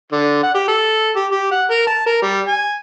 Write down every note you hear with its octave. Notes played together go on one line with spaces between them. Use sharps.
D3
F#5
G4
A4
G4
G4
F#5
A#4
A5
A#4
G3
G#5